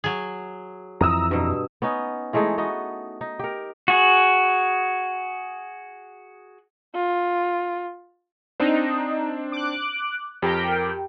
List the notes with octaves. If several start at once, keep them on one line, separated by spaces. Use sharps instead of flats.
F#3 G#4
F2 E3 A#5 D#6 E6
G2 B2
B3 C#4 D#4
E3 G#3 A3 D#4
B3 D#4 F#4 D#5
D#4
G4 A#4
F#4 G#4
F4
C4 D4 D#4 C5
D6 F#6
F2 G4 A#4 G5